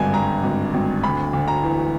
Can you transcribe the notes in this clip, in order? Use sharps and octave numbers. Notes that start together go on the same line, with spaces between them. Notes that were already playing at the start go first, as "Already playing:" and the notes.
Already playing: G#1 G2 D3 G#5
G2 A#5
G#1
G#1
D2 B5
D2
A#5
E3